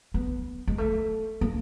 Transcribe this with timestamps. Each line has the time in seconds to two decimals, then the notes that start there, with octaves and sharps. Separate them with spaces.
0.14 B3
0.68 G#3
0.78 A3
1.41 A#3